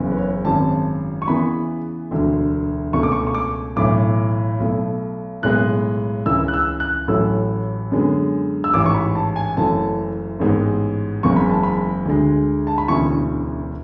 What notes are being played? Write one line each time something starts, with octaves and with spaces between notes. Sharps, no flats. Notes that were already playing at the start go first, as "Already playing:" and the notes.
Already playing: F#1 E2 C#3
B4
C#5
G#1 F#2 C#3 A5
C#6
E2 C#3 E3 B3 B5
E1 D2 D3
C#2 B2 A3 C#6
D6
C#6
C#6
D6
B1 A2 E3 D6
B1 B2 A3
B1 A2 G#3 B3 F#6
C#2 C#3 E3 E6
F#6
E6
F#6
A1 A2 F#3 A3 E6
F#2 D3 G#3 B3
E6
A1 G#2 E3 D6
C#6
B5
A5
G#5
F#1 F#2 E3 A3 A5
A1 G#2 G#3 B3
F#1 E2 C#3 G#3 C#6
B5
A5
B5
D2 D3 G#3
A5
B5
E1 D2 C#3 E3 B3 C#6